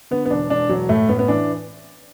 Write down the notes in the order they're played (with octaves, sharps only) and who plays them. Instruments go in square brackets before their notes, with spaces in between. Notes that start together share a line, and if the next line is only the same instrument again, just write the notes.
[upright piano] D3 B3
B3
E1 D4
E1 D4
E1 F#3
A2 A3
A2 B3
B3
E3 D4